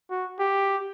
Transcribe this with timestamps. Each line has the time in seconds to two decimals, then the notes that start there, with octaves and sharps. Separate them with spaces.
0.11 F#4
0.39 G4